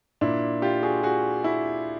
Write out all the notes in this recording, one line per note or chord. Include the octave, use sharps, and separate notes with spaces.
A#2 D4 E4
F4 G4
F#4 G#4
F#4 G#4
E4 F#4